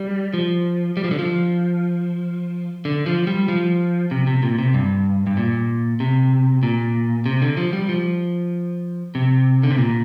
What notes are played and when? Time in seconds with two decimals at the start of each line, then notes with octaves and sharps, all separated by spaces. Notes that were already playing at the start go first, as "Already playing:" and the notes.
Already playing: G3
0.34 F3
0.97 G3
1.04 F3
1.11 D3
1.19 F3
2.85 D3
3.06 F3
3.27 G3
3.48 F3
4.11 C3
4.27 C3
4.43 A#2
4.59 C3
4.74 G2
5.27 G2
5.37 A#2
6.00 C3
6.63 A#2
7.26 C3
7.42 D3
7.57 F3
7.73 G3
7.89 F3
9.15 C3
9.63 D3
9.71 C3
9.78 A#2